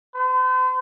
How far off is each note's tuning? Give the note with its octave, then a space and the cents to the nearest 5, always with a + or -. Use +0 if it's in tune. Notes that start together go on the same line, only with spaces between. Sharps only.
C5 -40